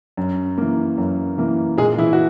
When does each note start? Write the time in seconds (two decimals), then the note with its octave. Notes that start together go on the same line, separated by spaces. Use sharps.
0.17 F#2
0.58 E3 A#3
0.98 F#2
1.38 E3 A#3
1.78 A#2 G#3 G#4
1.98 E3 E4
2.13 F#4